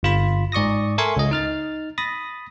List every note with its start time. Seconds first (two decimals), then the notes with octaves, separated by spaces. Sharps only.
0.03 G1 F4 B5
0.52 G#2 D5 C#6 D#6 A#6
0.98 A4 A#4 E5 G#5 C6 C#6
1.17 C#2 D#5
1.31 D#4 F6 A6
1.98 B5 D#6 A6 A#6